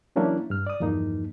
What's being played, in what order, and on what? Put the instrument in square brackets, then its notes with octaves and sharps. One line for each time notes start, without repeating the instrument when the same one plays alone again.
[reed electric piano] E3 F#3 A#3 C#4 D4 E4
G2 F6
D5 D#6
E2 G2 F3 A#3 D#4